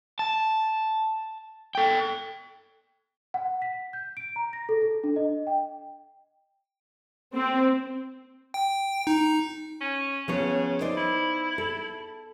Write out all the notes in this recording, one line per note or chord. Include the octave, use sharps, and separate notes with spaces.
A5
A4 G5
F#5
B6
G6
D7
A#5
A#6
A4
A4
D4
D#5
G5
C4
G5
D#4
C#4
C#3 F3 B3 C#5
D#4 C5 D5
E4
A4